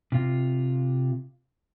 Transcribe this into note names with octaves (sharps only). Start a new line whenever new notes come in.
C3 F4